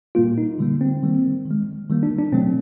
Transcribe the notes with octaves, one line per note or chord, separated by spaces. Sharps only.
A#2 G3 A#3 F4
D#4
D3 G3 A#3
C4
D#3 G3 A#3
D#3
G#3
D#3 G3 A#3
D4
D4
B2 F#3 A3 C4